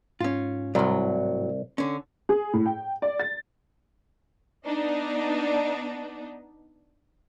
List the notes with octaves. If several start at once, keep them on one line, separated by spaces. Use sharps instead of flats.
G#2 C#4 F4
C2 A2 F#3
D3 C#4
G#4
A2
G5
D5
A6
B3 D4 D#4